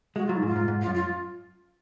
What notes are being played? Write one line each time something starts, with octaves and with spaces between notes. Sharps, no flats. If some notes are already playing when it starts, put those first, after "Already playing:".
G#3 F#4
F#3 F4
D#4
G#2 F4
G#2
G#2
F4
F#2
F4